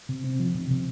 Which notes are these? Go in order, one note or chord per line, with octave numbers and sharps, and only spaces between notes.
C3
C4
F3
C3
C3